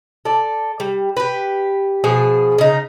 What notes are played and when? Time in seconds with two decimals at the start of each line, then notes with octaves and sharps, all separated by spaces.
0.25 A4 D5
0.80 G3
1.17 G4 B4
2.04 B2 F3 G#4
2.58 C#3 D#4